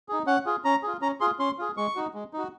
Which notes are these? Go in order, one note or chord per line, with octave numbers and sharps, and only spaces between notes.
D#4 G#4
C#4 F#5
F4 G#4
C#4 A#5
F4 G#4
C#4 A#5
F4 G#4 C6
C#4 C6
F4 G#4
G#3 C#6
D#4 F#4
G#3
D#4 F#4